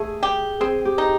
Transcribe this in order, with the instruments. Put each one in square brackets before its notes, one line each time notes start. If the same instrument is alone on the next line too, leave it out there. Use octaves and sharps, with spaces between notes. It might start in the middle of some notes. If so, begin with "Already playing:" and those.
Already playing: [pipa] A3 [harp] G#4
[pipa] G4
[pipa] C4 [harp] G#4
[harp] G4
[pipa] D#4